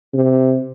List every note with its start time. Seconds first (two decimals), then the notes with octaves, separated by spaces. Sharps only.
0.14 C3